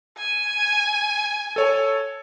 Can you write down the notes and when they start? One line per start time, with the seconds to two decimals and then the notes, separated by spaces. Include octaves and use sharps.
0.17 G#5
1.56 A4 C#5